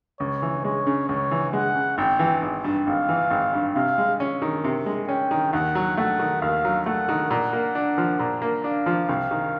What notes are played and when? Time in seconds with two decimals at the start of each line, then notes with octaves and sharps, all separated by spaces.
0.20 C#2 C#5
0.42 E3
0.64 G#3 C#5
0.87 C#3
1.09 C#2 C#5
1.31 E3
1.53 G#3 F#5
1.75 C#3
1.97 G#1 G5
2.19 E3
2.42 G#1
2.64 G2
2.87 G#1 F5
3.09 E3
3.30 G#1
3.53 G2
3.75 C3 F5
3.98 G#3
4.20 C#4
4.42 D#3
4.64 C3
4.86 G#3
5.08 C#4 G5
5.31 D#3
5.53 D#2 F#5
5.75 F#3
5.97 A3 F#5
6.19 D#3
6.42 D#2 F5
6.65 F#3
6.86 A3 F#5
7.09 D#3
7.31 A#2 F#5
7.53 A#3
7.75 D4
7.98 F3
8.19 A#2
8.42 A#3
8.64 D4 F5
8.86 F3
9.09 C2
9.31 D#3